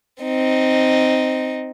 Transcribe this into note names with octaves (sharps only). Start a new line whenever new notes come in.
C4 D#4